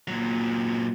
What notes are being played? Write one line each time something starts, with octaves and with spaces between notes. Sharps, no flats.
A#2 F#3